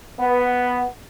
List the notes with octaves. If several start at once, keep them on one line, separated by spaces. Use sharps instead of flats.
B3